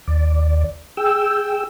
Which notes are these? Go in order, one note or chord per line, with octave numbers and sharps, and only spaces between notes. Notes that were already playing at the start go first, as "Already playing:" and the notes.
D#2 D5
G#4 G5 E6